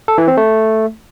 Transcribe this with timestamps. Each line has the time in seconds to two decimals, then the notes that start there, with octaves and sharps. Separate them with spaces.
0.08 A4
0.18 E3
0.28 C4
0.37 A3